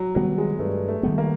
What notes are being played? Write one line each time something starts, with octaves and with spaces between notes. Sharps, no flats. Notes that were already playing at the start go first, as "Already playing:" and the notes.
Already playing: F#3
D#3 F#3 G3 B3
G#3
G2 A3
A3
D#3 G3 B3
A#3